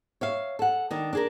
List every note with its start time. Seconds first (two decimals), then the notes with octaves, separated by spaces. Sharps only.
0.21 C#5 E5 F5
0.59 A4 F#5
0.91 D#3 D4
1.13 D4 G#4 A#4